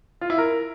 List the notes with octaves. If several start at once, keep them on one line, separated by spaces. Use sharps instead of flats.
F4
E4
A#4